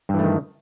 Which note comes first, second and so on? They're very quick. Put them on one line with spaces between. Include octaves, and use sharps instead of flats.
G2 E3 A3 D#3